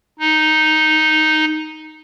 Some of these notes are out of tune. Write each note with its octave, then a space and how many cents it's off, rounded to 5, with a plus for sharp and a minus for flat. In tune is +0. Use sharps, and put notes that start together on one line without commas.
D#4 +0